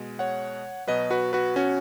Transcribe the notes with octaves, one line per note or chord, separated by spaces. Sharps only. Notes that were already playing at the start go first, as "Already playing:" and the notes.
Already playing: B2 G#3
C#5 F#5
B2 F#3 B4 D#5
F#4 B4
F#4 B4
C#4 F#4